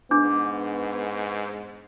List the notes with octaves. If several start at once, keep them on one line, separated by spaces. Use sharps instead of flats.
G#2 B3 D4 D6